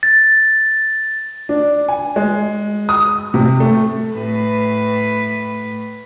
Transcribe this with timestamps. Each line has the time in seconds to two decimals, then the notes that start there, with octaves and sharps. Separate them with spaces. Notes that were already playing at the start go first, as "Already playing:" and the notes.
0.03 A6
1.49 D4
1.88 G#5
2.16 G#3
2.89 D#6
3.34 C3
3.60 A3
4.12 A2 B4